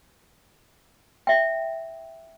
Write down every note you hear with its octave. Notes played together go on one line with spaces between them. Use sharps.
E5 G5